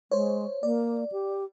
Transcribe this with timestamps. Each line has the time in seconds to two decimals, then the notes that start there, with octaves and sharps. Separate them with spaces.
0.11 G#3 C5 C#5
0.63 A#3 D5
1.12 G4